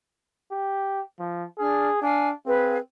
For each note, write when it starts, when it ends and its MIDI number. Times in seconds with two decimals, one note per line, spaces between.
0.51 1.01 67
1.19 1.44 53
1.58 1.89 62
1.58 1.99 68
1.58 1.89 89
2.02 2.32 62
2.02 2.29 77
2.02 2.29 80
2.46 2.80 60
2.46 2.77 68
2.46 2.77 71
2.46 2.77 77